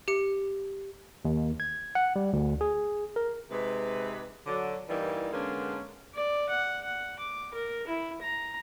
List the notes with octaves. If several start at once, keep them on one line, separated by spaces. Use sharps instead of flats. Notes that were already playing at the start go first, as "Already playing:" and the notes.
G4 C#7
D#2
G#6
F#5
G3
D2
G#4
A#4
C3 G#3 D#4 B4
D3 F#3
G2 E3 G3 A#3 D#4 E4
D3 G#3 A#3 B3 C#4 D4
D5
F#5
F#5
D6
A#4
E4
A#5